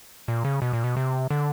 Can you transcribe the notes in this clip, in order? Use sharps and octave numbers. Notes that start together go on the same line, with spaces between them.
A#2
C#3
B2
A#2
B2
C3
D3